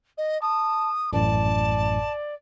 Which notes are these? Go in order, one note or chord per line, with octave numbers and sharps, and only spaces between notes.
D#5
A5 D#6
A1 F#2 A2 D5 A5